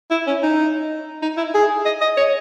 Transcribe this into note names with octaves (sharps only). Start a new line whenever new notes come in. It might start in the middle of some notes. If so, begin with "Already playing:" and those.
E4
C#4
D#4
D#4
E4
G#4
D#5
D#5
C#5